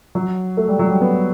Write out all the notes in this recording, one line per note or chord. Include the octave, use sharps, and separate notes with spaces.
F#3
A3
G3
F#3
G3
B3